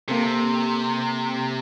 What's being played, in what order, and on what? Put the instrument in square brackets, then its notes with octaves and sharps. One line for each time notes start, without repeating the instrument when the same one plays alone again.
[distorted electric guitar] C3 [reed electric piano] A#3 C4 A4